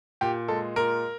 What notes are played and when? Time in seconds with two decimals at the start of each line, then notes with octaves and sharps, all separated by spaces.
0.21 A#2 G4
0.48 G#3 A4
0.76 A#2 A#4